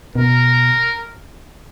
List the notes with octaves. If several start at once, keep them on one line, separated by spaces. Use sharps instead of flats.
B2 A#4